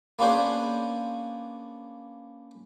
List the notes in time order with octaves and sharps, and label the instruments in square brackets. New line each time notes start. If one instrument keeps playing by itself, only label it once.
[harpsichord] A#3 B3 C#4 D4 G#4 C5